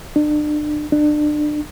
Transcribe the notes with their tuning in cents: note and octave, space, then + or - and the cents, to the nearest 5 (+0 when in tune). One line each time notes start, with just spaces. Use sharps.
D4 +35
D4 +30